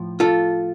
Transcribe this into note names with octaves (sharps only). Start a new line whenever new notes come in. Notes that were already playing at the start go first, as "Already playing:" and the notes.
Already playing: A2 F3
F4 A4